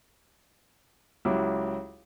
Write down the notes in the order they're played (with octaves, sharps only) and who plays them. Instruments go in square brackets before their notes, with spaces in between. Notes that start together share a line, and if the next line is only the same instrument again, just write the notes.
[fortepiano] C#2 F#3 E4 G4